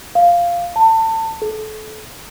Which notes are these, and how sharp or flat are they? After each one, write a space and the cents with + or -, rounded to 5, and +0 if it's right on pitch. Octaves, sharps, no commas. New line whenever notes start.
F5 -5
A5 +30
A4 -30